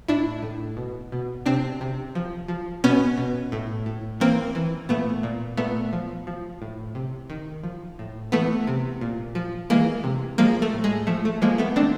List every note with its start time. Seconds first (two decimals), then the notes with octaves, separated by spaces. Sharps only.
0.08 A2 D4 E4
0.42 A2
0.77 B2
1.12 B2
1.46 C3 C4 D4
1.81 C3
2.15 F3
2.48 F3
2.84 B2 B3 C#4
3.18 B2
3.52 A2
3.86 A2
4.20 E3 A#3 C4
4.55 E3
4.89 A#2 A3 B3
5.23 A#2
5.57 A#2 A3 B3
5.93 F3
6.27 F3
6.62 A2
6.95 C3
7.30 D#3
7.63 F3
7.99 A2
8.32 E3 A3 B3
8.67 C3
9.01 A#2
9.35 F3
9.70 E3 G#3 A#3
10.04 C3
10.38 F3 G#3 A#3
10.62 A3
10.73 A2
10.84 G#3
11.07 F3 A3
11.25 A3
11.42 F3 G#3 A#3
11.58 A3 B3
11.76 D#3 C4 D4